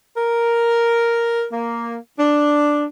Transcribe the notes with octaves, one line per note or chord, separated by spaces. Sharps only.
A#4
A#3
D4